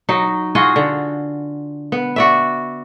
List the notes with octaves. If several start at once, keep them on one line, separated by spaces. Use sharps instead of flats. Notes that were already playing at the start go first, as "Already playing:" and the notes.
F#3 D#4
F4 F#4 G#4 D#5
D3
B3
F#4 D5 E5